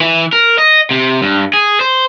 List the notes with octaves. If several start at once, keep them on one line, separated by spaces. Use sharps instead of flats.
E3
A#4
D#5
C3
G2
G#4
C5